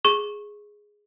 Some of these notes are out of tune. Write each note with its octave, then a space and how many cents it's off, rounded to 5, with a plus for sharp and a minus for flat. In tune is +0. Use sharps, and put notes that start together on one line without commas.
G#4 +0 C#6 -20